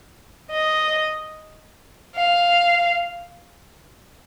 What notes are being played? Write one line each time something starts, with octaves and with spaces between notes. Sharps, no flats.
D#5
F5